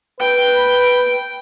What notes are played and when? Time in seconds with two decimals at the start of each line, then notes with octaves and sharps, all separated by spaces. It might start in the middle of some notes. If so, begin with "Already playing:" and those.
0.20 B4 G5